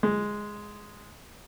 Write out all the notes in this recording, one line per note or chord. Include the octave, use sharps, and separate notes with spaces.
G#3